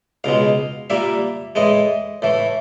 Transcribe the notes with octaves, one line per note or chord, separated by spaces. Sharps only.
C#2 B2 G#3 F5
A#2 G3 A#3 E5
A2 E3 G#3 D#5
A2 E3 A3